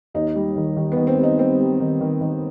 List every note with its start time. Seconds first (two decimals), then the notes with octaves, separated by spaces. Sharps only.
0.14 D#2 D#4
0.36 G3
0.56 D#3
0.77 D#3
0.92 B3
0.97 D#3
1.07 C4
1.18 G3
1.24 D#4
1.39 G3 C4
1.59 G3
1.80 D#3
2.01 D#3
2.21 D#3